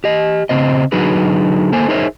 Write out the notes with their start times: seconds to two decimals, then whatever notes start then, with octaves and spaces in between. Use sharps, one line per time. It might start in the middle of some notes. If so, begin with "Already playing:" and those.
0.04 G4 D#5
0.49 C#3 C4 C5 D#5
0.92 D3 F#3 D#4 F#4 G#4 B4
1.73 A#3 A4 C5 G#5
1.89 D#4 G#4 A#4 C5 C#5 E5